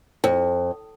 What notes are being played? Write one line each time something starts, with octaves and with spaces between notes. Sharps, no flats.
F2